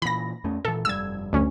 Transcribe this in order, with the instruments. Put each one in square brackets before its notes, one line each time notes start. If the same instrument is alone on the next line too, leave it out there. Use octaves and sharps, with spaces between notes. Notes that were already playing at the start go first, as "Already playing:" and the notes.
[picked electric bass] A#2 E3 [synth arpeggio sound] B5 A#6
[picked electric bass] E2 A3 C#4
[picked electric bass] A#2 E3 [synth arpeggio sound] A4
[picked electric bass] F1 G2 G3 [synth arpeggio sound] E6 G#6
[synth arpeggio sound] D2 C#4